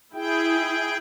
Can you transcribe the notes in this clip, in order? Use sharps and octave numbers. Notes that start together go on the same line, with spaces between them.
E4 G#4 G5